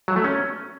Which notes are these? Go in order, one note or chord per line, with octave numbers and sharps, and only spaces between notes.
F#3
A3
C#4